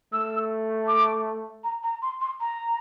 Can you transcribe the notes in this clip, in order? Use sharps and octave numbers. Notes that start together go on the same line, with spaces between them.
A3 E6
D6
A#5
A#5
C6
C6
A#5